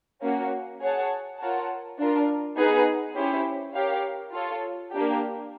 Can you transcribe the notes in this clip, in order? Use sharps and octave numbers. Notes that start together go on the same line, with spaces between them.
A#3 C#4 F#4
G#4 C#5 F#5 A5
F4 A#4 C#5 F#5 A5
D4 F4 A#4
B3 D#4 G#4 B4
C#4 E4 G4 C5
G4 A#4 C#5 F5
F4 A4 C#5
A#3 D4 G4